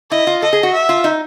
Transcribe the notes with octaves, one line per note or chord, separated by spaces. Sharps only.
E4 D#5
F4
A4 D#5
G#4
F#4
E5
F4
D#4